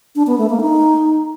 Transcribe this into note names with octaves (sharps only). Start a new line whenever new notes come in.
D4
B3
A3
A#3
D#4